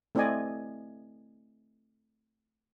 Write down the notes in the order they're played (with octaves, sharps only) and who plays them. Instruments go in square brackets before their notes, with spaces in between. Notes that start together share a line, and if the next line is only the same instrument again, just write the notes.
[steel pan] A3 C4 E4 D5 D#5 G#5